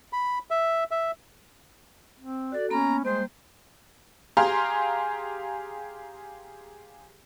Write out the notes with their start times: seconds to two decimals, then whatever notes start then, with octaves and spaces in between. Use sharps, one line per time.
0.13 B5
0.51 E5
0.91 E5
2.20 C4
2.52 F#4 A4 D5
2.70 A#3 B3 C#4 A#5 B5
3.05 G3 G#3 A#3 C5
4.37 G4 G#4 F5 A#5 C6